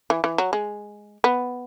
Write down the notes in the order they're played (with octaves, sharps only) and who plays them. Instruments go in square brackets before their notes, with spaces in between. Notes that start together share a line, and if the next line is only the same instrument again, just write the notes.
[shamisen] E3
E3
F#3
G#3
B3